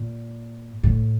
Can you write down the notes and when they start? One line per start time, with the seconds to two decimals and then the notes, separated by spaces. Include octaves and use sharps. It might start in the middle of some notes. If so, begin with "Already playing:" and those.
Already playing: A#2
0.83 A2